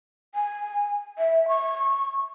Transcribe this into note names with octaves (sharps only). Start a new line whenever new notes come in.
G#5
E5
C#6